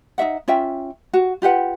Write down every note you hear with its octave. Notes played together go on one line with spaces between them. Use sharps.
D#4 F#4 E5 F#5
C#4 F4 E5 G5
F#4
F4 G4 B4 F#5